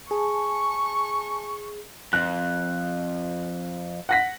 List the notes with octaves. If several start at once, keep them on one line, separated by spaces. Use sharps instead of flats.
G#4 G#5 A5 C#6
F2 F#6
F#5 A#6 B6